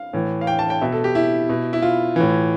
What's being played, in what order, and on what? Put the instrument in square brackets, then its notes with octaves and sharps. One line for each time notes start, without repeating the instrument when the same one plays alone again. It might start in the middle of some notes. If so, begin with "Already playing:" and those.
Already playing: [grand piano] F5
A2 E3
F5
G5
A5
G5
B2 E5
A4
G4
E4
B2
E4
F4
A2 E3